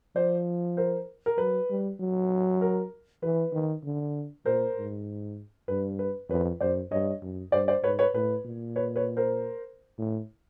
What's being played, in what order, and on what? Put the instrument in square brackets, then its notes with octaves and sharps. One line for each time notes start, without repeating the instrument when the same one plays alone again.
[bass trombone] F3 [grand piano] C5 D5
[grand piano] A#4 C5
A#4
[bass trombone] F#3 [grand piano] B4
[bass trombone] G3
F#3
[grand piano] A#4
[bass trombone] E3 [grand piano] B4
[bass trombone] D#3
D3
[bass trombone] A#2 [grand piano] A#4 C5
[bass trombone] G#2
[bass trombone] G2 [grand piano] B4
[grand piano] B4
[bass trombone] F2 [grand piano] B4 C#5
[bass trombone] F#2 [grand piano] C5 D5
[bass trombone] G2 [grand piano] C#5 D#5
[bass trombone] F#2
[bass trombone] G2 [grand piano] C5 D5
[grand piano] C5 D5
[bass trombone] G#2 [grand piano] B4 C#5
[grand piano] B4 C#5
[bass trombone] A2 [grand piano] B4
[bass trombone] A#2
[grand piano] B4 C#5
B4 C#5
A#4 C5
[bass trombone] A2